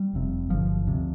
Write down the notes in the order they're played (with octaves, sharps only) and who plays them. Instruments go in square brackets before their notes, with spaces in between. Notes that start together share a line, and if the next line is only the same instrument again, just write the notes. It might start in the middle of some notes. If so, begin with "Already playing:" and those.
Already playing: [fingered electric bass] G3
F1 F2 C3
G1 G2 D3 F3
D2 C3